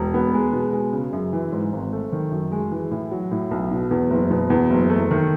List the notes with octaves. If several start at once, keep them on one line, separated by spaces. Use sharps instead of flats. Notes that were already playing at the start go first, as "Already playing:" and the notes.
Already playing: E1
B3
G#3
B2
G#3
C#3
F#2
E3
G#2
G#1
A3
D#3
F#2
G#3
E3
A2
F#3
A2
B1
B2
E2
F#1
B2
E2
F#1
A3
D#3